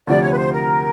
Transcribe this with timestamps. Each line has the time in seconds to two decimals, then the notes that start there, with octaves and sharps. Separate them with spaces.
0.07 D2 C3 F3 D5
0.23 C#5
0.33 B4
0.38 C5
0.53 A#4